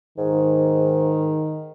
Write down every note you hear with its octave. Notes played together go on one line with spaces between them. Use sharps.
G#2 D#3